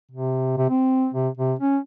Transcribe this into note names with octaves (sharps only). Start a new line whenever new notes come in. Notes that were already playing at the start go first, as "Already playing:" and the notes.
C3
C3
C4
C3
C3
C#4